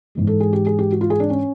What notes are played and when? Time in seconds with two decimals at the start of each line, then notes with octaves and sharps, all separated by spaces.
0.15 G#2 E3 G#3
0.27 A4
0.40 G#4
0.53 G4
0.66 G#4
0.79 G4
0.92 F#4
1.01 F4
1.10 G#4
1.20 D4
1.30 C#4